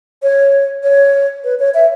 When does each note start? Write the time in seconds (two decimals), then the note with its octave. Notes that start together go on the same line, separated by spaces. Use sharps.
0.22 C#5
0.83 C#5
1.44 B4
1.59 C#5
1.74 E5